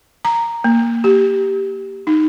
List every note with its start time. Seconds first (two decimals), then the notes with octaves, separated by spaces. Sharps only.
0.25 A#5
0.64 A#3
1.04 G4
2.07 D#4